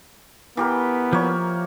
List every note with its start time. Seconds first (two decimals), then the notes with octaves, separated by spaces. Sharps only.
0.57 E3 B3 G4 A#4
1.13 F3 A#3 C#5